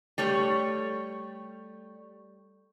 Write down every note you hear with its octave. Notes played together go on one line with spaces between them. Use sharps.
G3 A3 C#5